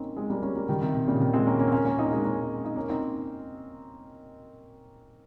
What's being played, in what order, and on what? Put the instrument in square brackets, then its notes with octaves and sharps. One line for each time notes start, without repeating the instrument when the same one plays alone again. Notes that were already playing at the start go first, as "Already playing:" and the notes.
Already playing: [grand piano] A#3 C4 C#4 D#4
G#3 C4
G3 A#3
A#3 C#4
G3 A#3
D#3 G3
C3 D#3
C3
A#2 C#3
C3 D#3
G#3 C4
A#3 C#4
A#3 C#4
C4
A#3 C#4
A#3 C#4
C4 D#4
A#3
G#3 C4
A#3 C#4
D#4
A#3 C#4
C4 D#4